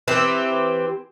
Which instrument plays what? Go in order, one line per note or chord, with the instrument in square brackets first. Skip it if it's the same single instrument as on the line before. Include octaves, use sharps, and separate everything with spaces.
[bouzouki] E3 C4 G4